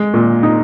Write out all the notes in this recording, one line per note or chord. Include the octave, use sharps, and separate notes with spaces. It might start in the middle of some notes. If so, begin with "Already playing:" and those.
Already playing: G#3
A#2
D#4